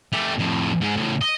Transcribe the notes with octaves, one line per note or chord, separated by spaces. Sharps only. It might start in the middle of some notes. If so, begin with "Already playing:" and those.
A3 G4
F2 A2
G#2 G#3
A2 C#3
D#5